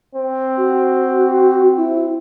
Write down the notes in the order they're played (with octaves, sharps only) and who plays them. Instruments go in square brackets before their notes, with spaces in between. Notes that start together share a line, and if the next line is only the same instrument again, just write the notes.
[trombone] C4
[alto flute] F#4
E4